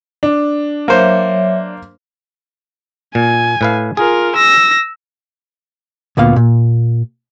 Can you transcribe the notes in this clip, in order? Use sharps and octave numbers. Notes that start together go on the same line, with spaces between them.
D4
F#3 A#3 C5 C#5 E5
A#2 G#5
A2 B4 F5
F4 G#4 A#4
E6 A#6
D2 A#2 B3 F5
A#2